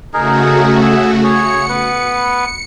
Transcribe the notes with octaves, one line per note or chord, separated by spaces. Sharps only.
C#3 A3 D#4 F#4 G#4 A#4
G#4 E5
G#4 C#5 C#7
B3 B4